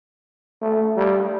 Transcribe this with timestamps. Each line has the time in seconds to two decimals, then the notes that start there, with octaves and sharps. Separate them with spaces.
0.62 A3
0.97 G3